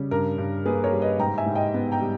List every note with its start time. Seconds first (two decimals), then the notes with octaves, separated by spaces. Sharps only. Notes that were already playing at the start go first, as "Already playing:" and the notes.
Already playing: C#3 G3
0.11 G2 A#4
0.38 G2
0.66 A#3 G#4 B4
0.84 A#4 C#5
0.93 G3
1.02 B4 D#5
1.19 G#2 G5 A#5
1.38 E5 G#5
1.46 G#2
1.55 D#5 G5
1.74 B3
1.92 G5 A#5
2.01 G3